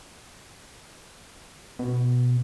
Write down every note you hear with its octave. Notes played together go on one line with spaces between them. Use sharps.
B2